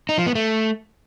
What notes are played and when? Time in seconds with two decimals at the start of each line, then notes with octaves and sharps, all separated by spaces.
0.09 D#4
0.18 F3
0.27 B3
0.35 A3